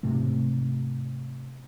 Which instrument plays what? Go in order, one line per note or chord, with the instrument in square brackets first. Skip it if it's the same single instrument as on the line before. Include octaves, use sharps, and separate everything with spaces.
[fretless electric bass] G#2 C3 A3